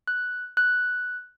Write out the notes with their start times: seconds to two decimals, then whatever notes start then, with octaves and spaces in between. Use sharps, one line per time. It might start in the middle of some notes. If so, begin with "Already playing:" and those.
0.08 F#6
0.57 F#6